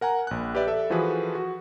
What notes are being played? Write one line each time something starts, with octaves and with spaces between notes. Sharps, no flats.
A#4 F#5 G#5 A#5
A#1 F#6
G4 B4 D5 E5
A4 E5
E3 F3 F#4 G#4 A4 B4
F#4